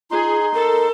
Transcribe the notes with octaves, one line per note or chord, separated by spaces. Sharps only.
D#4 F4 G#4 C6
A4 A#4